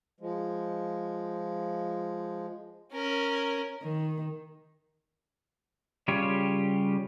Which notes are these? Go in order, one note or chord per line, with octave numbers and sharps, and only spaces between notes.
F3 G#3
C#4 A#4
D#3
C#3 G3 F4 G4 C#5